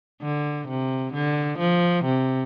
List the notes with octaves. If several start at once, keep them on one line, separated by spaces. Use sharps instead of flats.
D3
C3
D3
F3
C3